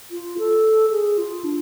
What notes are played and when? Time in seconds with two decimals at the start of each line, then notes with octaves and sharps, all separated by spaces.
0.11 F4
0.39 A4
0.91 G#4
1.18 F4
1.44 D4